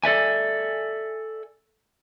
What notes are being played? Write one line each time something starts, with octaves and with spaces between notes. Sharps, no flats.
A4 D5 E5 G#5